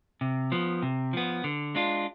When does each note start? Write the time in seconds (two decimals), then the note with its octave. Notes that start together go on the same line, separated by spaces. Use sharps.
0.21 C3
0.52 F3 B3
0.83 C3
1.13 F3 B3
1.44 D3
1.75 G#3 D4 F4